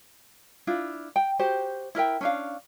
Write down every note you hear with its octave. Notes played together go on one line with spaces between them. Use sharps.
D4 E4 F4
G5
F#4 G4 C5
E4 A#4 E5 G5
C#4 D4 F5